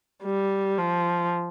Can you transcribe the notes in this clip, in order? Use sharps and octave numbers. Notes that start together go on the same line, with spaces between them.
G3
F3